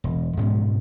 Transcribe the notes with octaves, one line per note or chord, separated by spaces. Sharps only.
E1
G#2 B2 G#3 C#4